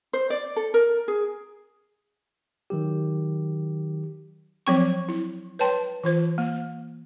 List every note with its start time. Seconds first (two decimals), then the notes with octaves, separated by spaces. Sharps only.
0.13 C5
0.30 D5
0.56 A4
0.74 A#4
1.08 G#4
2.70 D#3 F#3 G4
4.67 F3 F#3 C4 C#6
5.09 E4
5.59 B4 C#5 G5 A5 C6
6.03 E3 F4 C5
6.38 A#3